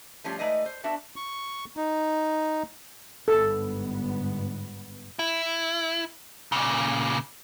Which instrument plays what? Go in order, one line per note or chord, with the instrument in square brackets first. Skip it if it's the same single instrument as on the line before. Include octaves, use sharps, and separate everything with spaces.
[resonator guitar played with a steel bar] F3 G3 A3 C#4 F4
G#3 A3 D#4 B4 D5 D#5
C5
B3 D4 F#4 E5
[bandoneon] C#6
D#4
[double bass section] G1 G#2 B3 [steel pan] A4
[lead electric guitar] E4
A#2 C#3